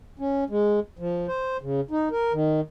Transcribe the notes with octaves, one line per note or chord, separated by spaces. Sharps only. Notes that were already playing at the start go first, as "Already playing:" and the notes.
C#4
G#3
F3
C5
C#3
D#4
A#4
D#3